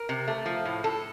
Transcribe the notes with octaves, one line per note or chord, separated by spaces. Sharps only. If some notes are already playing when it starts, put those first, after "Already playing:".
Already playing: A#4
C3
A3
F3
A2
A2 A4